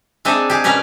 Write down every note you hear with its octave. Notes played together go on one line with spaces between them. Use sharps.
G#3 C4 D4 D#4 D#5 E5
G4 G#4
B2 G3 C#4 A#4 B4